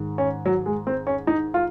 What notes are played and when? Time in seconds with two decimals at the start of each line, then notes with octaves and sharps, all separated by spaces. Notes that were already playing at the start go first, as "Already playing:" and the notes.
Already playing: G#2 D#3
0.18 C#4
0.46 F#3
0.66 G#3
0.87 C4
1.07 C#4
1.27 D#4
1.54 F4